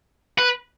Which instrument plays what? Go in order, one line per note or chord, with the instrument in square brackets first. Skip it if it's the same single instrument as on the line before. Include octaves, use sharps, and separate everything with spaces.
[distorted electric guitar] B4